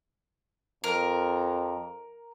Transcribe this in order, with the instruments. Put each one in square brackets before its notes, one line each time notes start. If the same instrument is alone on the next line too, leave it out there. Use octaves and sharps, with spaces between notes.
[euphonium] F2 [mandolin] A#4